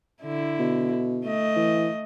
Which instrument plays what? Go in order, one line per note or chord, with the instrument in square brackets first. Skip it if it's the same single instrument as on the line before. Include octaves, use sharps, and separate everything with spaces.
[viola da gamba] D3 E4
[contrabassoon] B2
[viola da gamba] A3 D#5
[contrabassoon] E3